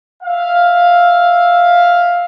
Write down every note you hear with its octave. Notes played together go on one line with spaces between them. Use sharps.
E5 F5